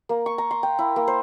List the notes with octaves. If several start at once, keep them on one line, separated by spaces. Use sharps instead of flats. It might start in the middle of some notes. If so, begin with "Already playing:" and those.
A#3
C#6
A#5
C6
G5
E4
A#3
C5